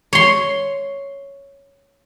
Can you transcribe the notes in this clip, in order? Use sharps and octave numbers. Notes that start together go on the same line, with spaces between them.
C#5 C6